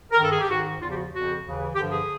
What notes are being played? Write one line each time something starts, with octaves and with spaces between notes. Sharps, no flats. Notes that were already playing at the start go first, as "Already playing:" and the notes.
A#4
G2 D#3 A4
G#4
G4
G#2 D#3 F#4
E2 C#3 F3 F4
G4
F#4
F2 C#3 F3 F#4
D#2 C#3 E3
G2 D3 F3 G4
G#4